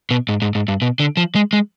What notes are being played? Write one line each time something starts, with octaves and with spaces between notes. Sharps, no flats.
B2
G#2
G#2
G#2
G2
B2
D3
F3
G#3
G#3